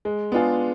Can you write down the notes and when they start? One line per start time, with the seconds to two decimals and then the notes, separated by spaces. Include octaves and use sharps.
0.05 G#3
0.32 B3 D4 F4 G#4